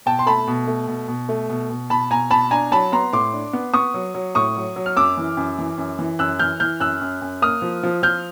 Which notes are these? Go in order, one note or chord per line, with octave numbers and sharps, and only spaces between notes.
B2 G5 A5
C6
A3 A5 B5
B2
A3
B2
B2
A3
B2
B2
B2 A5 B5
B2 G#5 A#5
B2 A5 B5
D4 G#5 A#5
F#3 A5 B5
B3 A#5 C6
A2 C6 D6
D4
B3
B3 C#6 D#6
F#3
F#3
A2 C#6 D#6
F#3
F#3
F6
F#2 D6 E6
E3
F#2
E3
F#2
E3
F#2 E6 F#6
E3 F6 G6
E3 F6 G6
F#2 E6 F#6
F#2
F#2
A#3 D#6 F6
F3
F3
F3 F6 G6